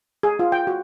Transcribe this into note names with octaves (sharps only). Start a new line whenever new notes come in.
G#4
F4
G5
F#4